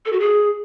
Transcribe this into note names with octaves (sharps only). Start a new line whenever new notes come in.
A4
F#4
G#4